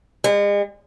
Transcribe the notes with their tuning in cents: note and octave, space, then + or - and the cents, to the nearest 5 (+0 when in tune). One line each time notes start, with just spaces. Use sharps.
G#3 -40